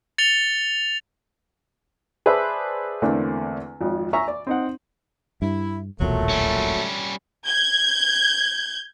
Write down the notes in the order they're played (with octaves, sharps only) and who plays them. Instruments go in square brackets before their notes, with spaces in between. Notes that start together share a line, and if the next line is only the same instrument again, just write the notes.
[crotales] A6 C#7 F7 G7
[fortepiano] G#4 B4 C5 D5 E5 A5
E2 D3 A3 A#3 C4
G#1 F2
E5 G#5 A#5 C#6
D5
C4 D#4 F#5
[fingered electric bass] G2 [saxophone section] E4
[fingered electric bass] D#1 B1 E2 [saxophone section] A#2 F#3 [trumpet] A3
[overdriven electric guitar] G3 C#4
[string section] G6 G#6